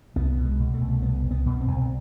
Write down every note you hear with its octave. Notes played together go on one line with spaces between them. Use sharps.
C2 B3
B2
G#3
B2
A3
C2
C2 B3
C2
B3
B2
C4
C2